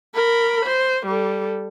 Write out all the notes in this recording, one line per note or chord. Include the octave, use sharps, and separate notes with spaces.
A#4 B5
C5
G3 A4